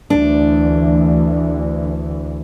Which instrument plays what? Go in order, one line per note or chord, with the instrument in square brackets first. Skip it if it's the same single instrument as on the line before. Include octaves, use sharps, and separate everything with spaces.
[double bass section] D2 E3 [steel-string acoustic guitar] D4